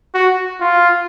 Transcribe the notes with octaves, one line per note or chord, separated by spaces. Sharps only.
F#4
F4